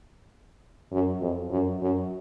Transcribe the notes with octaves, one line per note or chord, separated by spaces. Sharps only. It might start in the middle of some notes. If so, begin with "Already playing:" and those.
F#2
F2
F#2
F#2